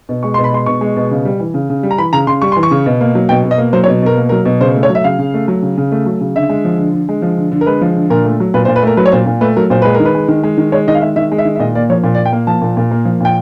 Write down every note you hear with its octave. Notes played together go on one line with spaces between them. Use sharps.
B2
G#3 C#6
B2 C6
B5
G#3 C6
B2 C#6
G#3
B2
C#3
G3
E3
C#3
C#3
G3
A#5
E3 B5
C#3 A#5
C#3 C6
G3 C#6
E3 C6
C#6
C#3
B2
A#3
F#3
B2 G5
B2
D#5
A#3
F#3 C5
C#5
B2
B2 A#4
A#3
F#3 A#4
B2
C#3 C5
A3
C#5
F#3
E5
C#3 F5
C#3
A3
F#3
C#3
C#3
A3
F#3
C#3
D3 E5
G#3
F3
D3
D3
G#3
F3
D3
D3
A#4
G#3 B4
F3
D3
A#2 A#4
A3
F#3
A#2 B4
C5
A#2
B4
A3 A#4
F#3 B4
C#5
A#2 C5
A#2
A3 B4
F#3 A#4
A#2 C5
G#3 B4
A#4
D#3
B4
G#3
D#3
G#3
D#3
G#3 C#5
D#3 D#5
F5
G#3 E5
D#3 E5
G#3
E5
D#3
E5
A#2 D#5
A#3 D5
F3 C#5
A#2
D5
A#2
G5
A#3
F3 A5
A#2
A#2
A#3
F3
A#2 G5